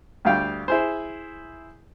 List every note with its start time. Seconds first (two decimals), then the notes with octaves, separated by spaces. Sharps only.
0.25 D2 G3 F5 G5
0.68 E4 G#4 C5